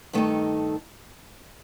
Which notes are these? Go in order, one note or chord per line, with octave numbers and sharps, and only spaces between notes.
G2 D#3 A3 D#4 A4